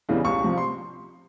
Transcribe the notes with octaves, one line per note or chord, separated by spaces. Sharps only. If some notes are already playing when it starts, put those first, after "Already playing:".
E2 C#3 E3 G3
C#2 C#6
C3 F3
C6